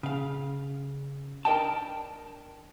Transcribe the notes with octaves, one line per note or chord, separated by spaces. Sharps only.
C#3 F5
D4 A#4 D#5 G5 A5